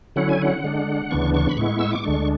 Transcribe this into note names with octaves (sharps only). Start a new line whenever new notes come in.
D3 F#3 C#4 E4 F#5
G#5
F#5
D3 G#3 D4
D2 C#3 E3 B3 D4 C#6
C#6
B5
A2 G#3 B3 E4 C#6
E6
D6
D2 D3 G#3 D4 C#6